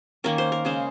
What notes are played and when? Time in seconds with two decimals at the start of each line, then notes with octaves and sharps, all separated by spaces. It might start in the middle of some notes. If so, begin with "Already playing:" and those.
0.24 D#3 A#3 C#4 A#4
0.38 C5
0.52 A#4
0.65 C#3 G#3 C#4 C5